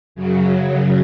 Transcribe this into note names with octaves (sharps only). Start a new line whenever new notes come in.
F#2 C#3 F#3